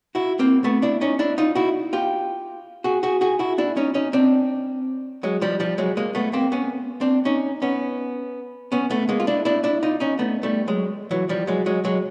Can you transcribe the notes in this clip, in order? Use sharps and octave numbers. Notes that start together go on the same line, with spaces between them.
E4 F#4
A#3 C4
A3 B3
D4 E4
C#4 D#4
D4 E4
D#4 F4
E4 F#4
F4 G4
F#4 G#4
F#4 G#4
F#4 G#4
E4 F#4
D4 E4
C#4 D#4
C#4 D#4
C4 D4
F#3 G#3
F3 G3
F3 G3
F#3 G#3
G#3 A#3
A3 B3
A#3 C4
B3 C#4
C4 D4
C#4 D#4
B3 C#4
B3 C#4
A3 B3
G#3 A#3
F4
D4 E4
D4 E4
D4 E4
D#4 F4
C#4 D#4
A3 B3
G3 A3
F#3 G#3
E3 F#3
F3 G3
F#3 G#3
F#3 G#3
F#3 G#3